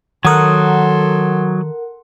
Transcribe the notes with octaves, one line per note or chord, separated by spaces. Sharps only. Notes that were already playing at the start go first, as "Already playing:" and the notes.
D#3 F#3 A4 A#4 F#5 C6 D#6 F#6